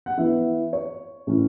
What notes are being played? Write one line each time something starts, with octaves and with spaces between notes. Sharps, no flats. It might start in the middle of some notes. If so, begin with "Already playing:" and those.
F#5
E3 B3 E4 E5
C#5
A2 E3 C#4 E4